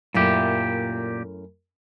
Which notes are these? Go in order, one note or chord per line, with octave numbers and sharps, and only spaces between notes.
F#2 A#2 A3 E4 G4